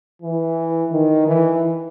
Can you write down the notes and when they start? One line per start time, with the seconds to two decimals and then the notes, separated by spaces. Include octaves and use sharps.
0.22 E3
0.92 D#3
1.27 E3